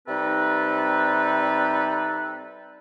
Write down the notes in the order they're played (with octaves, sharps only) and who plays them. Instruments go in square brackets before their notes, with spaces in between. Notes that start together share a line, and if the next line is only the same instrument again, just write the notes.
[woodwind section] C3 G3 C4 D#4 A4 B4